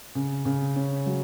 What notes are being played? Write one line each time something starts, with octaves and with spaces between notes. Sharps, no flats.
C#3
C#3
C#4
F#3